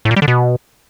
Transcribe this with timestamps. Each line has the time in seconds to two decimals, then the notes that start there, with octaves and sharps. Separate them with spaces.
0.05 A2
0.11 A#2
0.16 G3
0.22 D3
0.28 B2